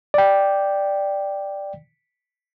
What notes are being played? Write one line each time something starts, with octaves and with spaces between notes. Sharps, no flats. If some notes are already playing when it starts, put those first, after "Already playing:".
D5 G5